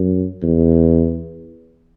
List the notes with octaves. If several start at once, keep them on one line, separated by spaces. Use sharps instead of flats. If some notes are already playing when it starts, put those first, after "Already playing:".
Already playing: F#2
E2